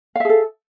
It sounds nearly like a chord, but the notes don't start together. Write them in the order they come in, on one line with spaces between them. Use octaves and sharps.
F5 E5 G#4 A4